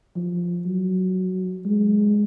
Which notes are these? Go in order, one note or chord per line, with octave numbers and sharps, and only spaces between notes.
F3
F#3
G#3